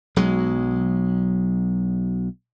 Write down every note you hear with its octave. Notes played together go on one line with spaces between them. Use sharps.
B1 F#3 G#3